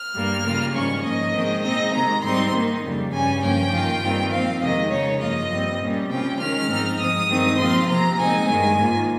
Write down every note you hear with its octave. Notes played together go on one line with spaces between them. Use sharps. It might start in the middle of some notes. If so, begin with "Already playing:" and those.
Already playing: F6
G2 G3 A#3
C#3 G3 A#3 F4
G#2 D#3 G3 C#4 C#6
G#2 F3 A#3 D#5
D#3 G#3 C4
A#2 G#3 C4 D#4 D#5
C3 D#3 G#3 A#5
G#2 G3 C4 D#4 C6
D#3 A#3 D#4
F2 C#3 G3
G2 G3 C#4 G#5
G2 F3 A#3 C#4 G5
G2 D#3 A#3 F4
G2 D#3 G3 C4 F4
A#2 F3 C4 F5
F2 C3 D#3 G#3 D#5
C#3 G#3 D#4 C#5
G2 F3 A#3 F4 D#5
G2 G3 C4
A#2 G3 C#4
C3 G3 C#4 F4 G5
D#3 G#3 C#4 F6
G#2 F3 C4 D#4
G#2 F3 G#3 D#6
G2 D#3 G#3 C4 D#4
A#2 F3 C4 F4 C6
C3 F3 C4 A#5
A#2 G#3 C4 D#4 G#5
G2 D#3 G#3
G#2 D#3 A#3 F4